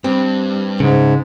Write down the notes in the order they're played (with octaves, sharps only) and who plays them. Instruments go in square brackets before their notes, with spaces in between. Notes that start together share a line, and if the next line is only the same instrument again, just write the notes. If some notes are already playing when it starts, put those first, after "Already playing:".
[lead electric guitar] G2 [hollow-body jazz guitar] C4
[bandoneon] G#2 [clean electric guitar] C#3